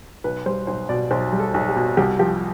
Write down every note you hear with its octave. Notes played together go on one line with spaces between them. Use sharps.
B1 B4
G3 C5
B1 C5
B2 D5
B1 C5
G3
A4
B1
G4
B2
C2 G4
F3 G4